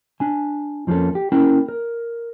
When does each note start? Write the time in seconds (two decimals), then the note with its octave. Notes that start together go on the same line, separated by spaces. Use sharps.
0.20 D4 G#5
0.87 F2 F3 A#3 C#4 A4
1.15 G4
1.32 A#3 C#4 E4 A#4 G5
1.68 A#4